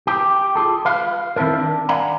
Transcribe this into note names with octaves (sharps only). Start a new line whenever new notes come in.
G4
F4 G#4 A4
B4 F5
D#3 C4 E4 A4 A#4
D4
D5 F5 F#5 G#5 A#5